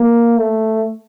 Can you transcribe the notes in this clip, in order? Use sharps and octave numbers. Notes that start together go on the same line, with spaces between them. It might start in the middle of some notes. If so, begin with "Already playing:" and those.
Already playing: A#3
A3